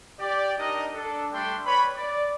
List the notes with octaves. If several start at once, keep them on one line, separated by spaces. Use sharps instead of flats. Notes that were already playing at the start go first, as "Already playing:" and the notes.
G4 D5
D4 D#4 A#4 D#5
D4 A4
G3 A3 D4 G5 C6 D6
B4 C#5 D5 B5
D5